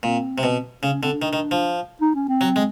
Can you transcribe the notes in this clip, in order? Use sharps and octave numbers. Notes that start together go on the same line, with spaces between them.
A#2 C4
C3
B2
C#3 C#4
C#4
D3 C4
D4
D#3
D#3
F3
D#4
C#4
C4
F#3
G#3